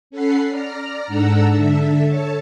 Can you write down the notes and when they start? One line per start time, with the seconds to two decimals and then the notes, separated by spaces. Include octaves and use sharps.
0.10 C#4 A4 F#5 B5 C7
0.49 D5 A#5 F6
1.07 G#2 D4 A4 F#5 A#5 E6
1.53 D3 A4 E5
2.07 A4 C#5 A5